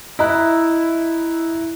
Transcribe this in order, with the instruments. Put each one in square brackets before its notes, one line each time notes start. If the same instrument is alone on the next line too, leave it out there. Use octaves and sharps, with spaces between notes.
[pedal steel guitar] E4 [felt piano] D#5 A#5 F#6